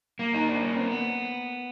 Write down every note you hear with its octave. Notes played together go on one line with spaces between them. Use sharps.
A#3
D#4
D4
C#4
C4
B3